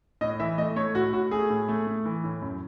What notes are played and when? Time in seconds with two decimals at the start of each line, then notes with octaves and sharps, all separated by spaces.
0.21 A2 D#5
0.40 E3 E5
0.58 A3 D#5
0.76 A3 C#5
0.95 A2 F#4
1.13 A2 F#4
1.31 A3 G#4
1.50 A2
1.68 A3
1.87 A3
2.05 E3
2.24 A2
2.42 F#2